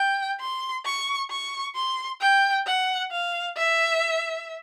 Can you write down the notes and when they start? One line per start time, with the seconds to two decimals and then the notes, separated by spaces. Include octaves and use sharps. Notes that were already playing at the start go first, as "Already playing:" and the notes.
Already playing: G5
0.40 C6
0.85 C#6
1.30 C#6
1.75 C6
2.21 G5
2.66 F#5
3.11 F5
3.57 E5